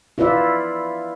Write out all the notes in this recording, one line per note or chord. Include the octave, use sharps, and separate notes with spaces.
E4 F4 B4 D5 E5